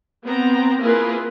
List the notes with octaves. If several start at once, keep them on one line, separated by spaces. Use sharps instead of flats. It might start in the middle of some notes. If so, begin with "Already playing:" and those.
B3 C4 A#5
A#3 E4 F4 G#4 A#4 B4